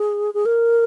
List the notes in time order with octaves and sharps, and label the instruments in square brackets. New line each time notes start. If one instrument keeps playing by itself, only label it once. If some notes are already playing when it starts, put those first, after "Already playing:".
Already playing: [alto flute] G#4
G#4
A#4